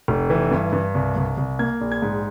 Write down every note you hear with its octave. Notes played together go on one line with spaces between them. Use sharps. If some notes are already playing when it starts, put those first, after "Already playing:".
F1
E3
G2
G2
C2
C2
C2
A#3 G#6
A#1
G#6
G#2